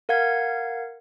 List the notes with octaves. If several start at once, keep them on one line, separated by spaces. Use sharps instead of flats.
A#4 F5 F#5 G#6